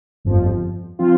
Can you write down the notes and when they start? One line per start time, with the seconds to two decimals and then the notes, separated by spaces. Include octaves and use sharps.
0.25 G1 F2 F3
0.99 F3 C4 F4